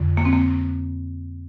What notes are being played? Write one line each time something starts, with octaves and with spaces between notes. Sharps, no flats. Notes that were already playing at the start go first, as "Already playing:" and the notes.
Already playing: F2 D3
A#3
C4
A#3